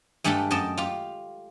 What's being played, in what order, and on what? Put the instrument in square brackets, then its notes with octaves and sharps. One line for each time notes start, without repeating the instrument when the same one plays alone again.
[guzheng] G2 G#3 A3 G4 A4 G5
F#2 D#5 G5 A5
F4 G4